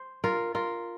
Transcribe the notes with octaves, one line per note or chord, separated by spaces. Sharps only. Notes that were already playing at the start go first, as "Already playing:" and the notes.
Already playing: C5
F4 A#4
F4 A#4